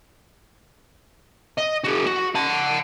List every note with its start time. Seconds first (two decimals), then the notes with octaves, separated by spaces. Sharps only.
1.58 D#5
1.85 F#4 G#4
2.07 F#4
2.35 F#5 A5